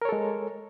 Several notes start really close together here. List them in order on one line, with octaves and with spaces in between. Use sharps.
A#4 C#5 A4 G#3